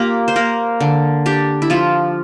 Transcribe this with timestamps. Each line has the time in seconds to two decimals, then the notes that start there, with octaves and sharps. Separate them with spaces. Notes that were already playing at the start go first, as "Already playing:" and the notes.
Already playing: A#3 F4 G4 A#4
0.28 C5
0.36 A#3 A#4
0.80 D3
1.26 D4 G4
1.62 E4
1.70 F3 F4